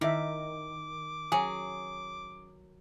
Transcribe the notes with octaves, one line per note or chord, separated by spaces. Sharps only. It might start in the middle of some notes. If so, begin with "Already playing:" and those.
D#3 E4 E5 D6
F#3 C#4 G#4